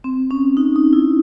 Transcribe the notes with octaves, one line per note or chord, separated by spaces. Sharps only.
C4
C#4
D#4
D#4
E4